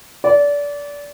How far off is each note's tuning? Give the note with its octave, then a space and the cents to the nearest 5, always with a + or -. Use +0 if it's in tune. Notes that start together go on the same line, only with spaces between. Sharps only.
D5 -25